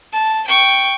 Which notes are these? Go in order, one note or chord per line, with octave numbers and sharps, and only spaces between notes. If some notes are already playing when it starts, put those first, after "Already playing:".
A5
G5 C#6